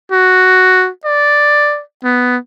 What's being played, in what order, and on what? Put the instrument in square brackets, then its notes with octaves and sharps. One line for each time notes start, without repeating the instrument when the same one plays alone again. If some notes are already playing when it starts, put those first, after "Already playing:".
[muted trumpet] F#4
D5
B3